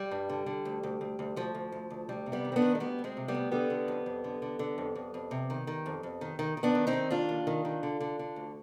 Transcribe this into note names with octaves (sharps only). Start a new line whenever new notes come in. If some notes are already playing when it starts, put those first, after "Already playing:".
Already playing: G3
G2
D3
D3
D2
D2
D2
D2
D2 F3
D2
D2
D2
D2 G3
C3
G3 B3
D#3
C4
B3 D4
D#3
G#3
D2 G3 B3
D2
G#3 C4
C3
G3 B3
D2
D3 G3 B3
D3
F2
F2
D3
D3
D3
F2
F2
F2
C3
D#3
D#3
F2
F2
D#3
D#3
D#3
B3 D4
D#3
C4 D#4
D#3
D#2 D4 F4
D#2
D#3
D#3
D3
D3
D3
D2